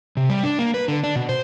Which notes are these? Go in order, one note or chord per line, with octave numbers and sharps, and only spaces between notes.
C3
G3
D4
A#3
B4
D3
D4
B2
C5